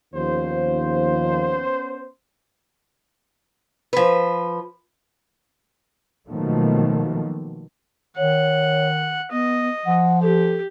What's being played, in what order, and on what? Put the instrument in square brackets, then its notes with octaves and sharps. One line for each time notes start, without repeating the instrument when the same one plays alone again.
[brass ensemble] D#2 F3 [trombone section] B3 C#4 C5
[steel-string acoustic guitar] F3 B4
[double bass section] B2 D#3 F3 F#3 A3 A#3
[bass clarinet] D#3 [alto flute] C#5 [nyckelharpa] F#5
[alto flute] B3 [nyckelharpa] D#5
[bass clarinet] F3 [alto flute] F#5
[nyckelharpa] G4 [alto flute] A4